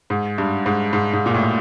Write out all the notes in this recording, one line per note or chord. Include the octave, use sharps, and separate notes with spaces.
G#2
G2
G#2
G#2
G#2
A#2
A2